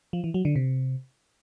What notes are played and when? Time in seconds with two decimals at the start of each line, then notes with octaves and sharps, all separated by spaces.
0.13 F3
0.24 E3
0.34 F#3
0.45 D3
0.56 C3